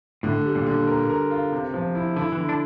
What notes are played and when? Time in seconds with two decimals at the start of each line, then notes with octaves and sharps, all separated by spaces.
0.23 A2 D3
0.45 G3
0.55 A#2
0.66 D3
0.88 A#4
1.09 A#4
1.31 F4
1.52 C3
1.74 F3
1.95 E4
2.16 D3 E4
2.32 E3
2.38 D3
2.49 D4